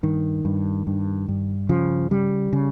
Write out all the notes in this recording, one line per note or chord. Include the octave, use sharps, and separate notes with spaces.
G2 D#3
G2
G2
G2
C#3 F3
C#3 G3
C#3